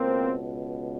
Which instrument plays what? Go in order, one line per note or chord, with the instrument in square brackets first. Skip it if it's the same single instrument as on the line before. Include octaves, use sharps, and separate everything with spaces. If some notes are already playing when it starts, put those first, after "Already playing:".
Already playing: [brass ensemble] C#2 B2 A#3 C4